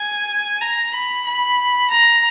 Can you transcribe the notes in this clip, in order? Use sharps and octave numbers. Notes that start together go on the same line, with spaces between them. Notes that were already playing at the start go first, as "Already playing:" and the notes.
Already playing: G#5
A#5
B5
B5
A#5